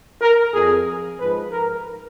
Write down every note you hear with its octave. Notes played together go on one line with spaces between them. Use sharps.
A#4
F2 F3 G#4
G#2 F3 B4
A#4